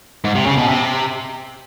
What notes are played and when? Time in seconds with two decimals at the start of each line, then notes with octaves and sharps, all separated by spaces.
0.24 G#2
0.35 C3
0.46 C#3
0.57 B2
0.68 C3